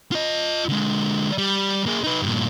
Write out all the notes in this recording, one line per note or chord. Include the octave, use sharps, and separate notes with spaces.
F4 D#5
D3 G#3
G3
A#3 G#4
D#4 B4
G2 A#2